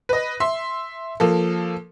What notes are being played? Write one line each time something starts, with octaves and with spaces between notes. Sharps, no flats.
B4 D#5
E5 C6
F3 A#3 A4